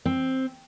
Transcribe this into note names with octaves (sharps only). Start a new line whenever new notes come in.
C4